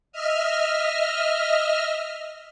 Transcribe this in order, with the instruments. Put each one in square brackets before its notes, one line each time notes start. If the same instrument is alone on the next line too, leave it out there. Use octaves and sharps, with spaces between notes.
[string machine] D#5 E5 F6